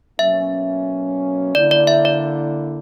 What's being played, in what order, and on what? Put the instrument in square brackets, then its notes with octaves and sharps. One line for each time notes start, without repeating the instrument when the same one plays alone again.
[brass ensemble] B2 F#3 A#3 C#4 [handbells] E5
[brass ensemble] D3 A#3 E4 [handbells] D5
[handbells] D5
E5
D5